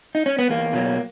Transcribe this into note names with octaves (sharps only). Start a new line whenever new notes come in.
D#4
C#4
B3
E2 A#3
B2 F#3